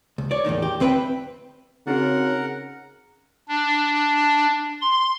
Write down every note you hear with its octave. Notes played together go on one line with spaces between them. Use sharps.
C#2
C#5 D5
E2 A2 D#3 D#4
G4
D2 C4 B4 E5 G5
C#3 C4 D#4 F#4 A#4 F#5
D4
C6